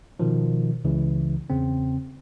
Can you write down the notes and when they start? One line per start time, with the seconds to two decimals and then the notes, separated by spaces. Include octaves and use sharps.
0.20 B2 D#3 F3
0.84 C#2 C#3 E3
1.50 E2 C#3 C4